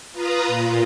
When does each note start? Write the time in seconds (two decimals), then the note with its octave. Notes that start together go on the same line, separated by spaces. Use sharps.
0.12 F4 B4 A#5 D#6
0.47 A#2